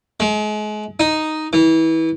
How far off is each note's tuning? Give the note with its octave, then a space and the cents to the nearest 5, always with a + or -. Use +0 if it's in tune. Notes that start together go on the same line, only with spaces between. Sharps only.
G#3 +35
D#4 +0
E3 -25